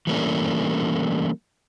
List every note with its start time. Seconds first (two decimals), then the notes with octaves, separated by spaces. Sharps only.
0.07 E3 G3 A3 A#3 C#4 D4